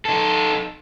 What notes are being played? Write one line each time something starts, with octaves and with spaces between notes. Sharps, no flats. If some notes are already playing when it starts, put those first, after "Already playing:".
D#4 A4